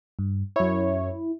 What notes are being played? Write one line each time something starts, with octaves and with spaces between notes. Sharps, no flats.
G2
F#2 E4 C#5